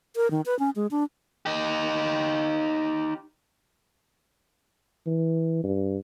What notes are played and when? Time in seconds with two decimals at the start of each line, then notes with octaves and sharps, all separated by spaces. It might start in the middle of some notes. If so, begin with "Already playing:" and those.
0.16 A#4
0.31 D#3
0.46 B4
0.59 C#4
0.76 G#3
0.91 D4
1.46 D#4 G4
5.06 E3
5.64 G2